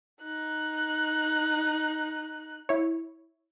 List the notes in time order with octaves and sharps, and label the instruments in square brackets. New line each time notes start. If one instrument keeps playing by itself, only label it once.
[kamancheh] D#4 F#6
[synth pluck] E4 C#5